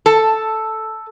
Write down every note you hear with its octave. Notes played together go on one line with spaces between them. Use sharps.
A4